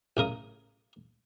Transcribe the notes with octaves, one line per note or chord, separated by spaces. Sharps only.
A1 C#3 A#4 D#6